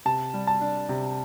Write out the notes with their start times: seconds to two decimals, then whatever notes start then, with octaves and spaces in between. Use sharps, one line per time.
0.05 C3 A5
0.34 G3
0.47 A5
0.61 D4
0.89 C3